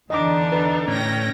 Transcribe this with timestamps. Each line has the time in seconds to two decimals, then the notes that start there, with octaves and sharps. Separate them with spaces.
0.10 E2 D3 E3 D4 D#4 D#5 D6
0.52 A4 B4
0.88 A2 C#4 G5 A#6